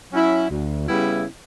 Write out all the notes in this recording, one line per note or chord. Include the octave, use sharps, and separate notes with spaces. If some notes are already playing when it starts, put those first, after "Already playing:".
F#3 C#4 E4
D2
C#3 G3 B3 E4